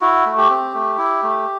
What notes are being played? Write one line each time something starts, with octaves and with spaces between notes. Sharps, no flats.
E4 F#4
A3
G4
C4
A3
E4
A3